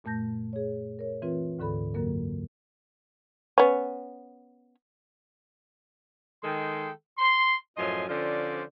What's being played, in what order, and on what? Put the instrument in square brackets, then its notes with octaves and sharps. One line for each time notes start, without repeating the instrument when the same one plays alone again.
[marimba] F#2 A#2 A3 A5 G6 A#6
G#4 C#5
A#4 C#5
E3 C4 F4 B4
D2 G#2 D3 A4 B5
F#2 D3 F#3 A#3 A#4
[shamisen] B3 C#4
[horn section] D#3 G#3 G#4 A4 G5 C6
C6
F#2 A2 F3 D#5 G#5 C6
D3 F3 C#4 F4 C5 D5